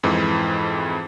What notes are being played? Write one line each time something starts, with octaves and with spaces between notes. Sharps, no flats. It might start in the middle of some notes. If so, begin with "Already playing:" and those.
F2 G#2 E3